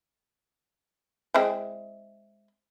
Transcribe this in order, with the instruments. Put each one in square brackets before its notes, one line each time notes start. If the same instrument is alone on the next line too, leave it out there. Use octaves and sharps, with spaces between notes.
[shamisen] G#3 C4 E4